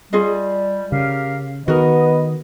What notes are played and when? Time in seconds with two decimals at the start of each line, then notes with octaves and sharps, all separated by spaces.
0.13 G3 F4 G#4 D#5
0.92 C#3 G4 A#4 F5
1.68 D#3 B3 F#4 A#4 D#5